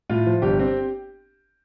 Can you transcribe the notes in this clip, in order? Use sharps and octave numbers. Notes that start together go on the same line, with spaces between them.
A2 F4
F3
G1 G4
C4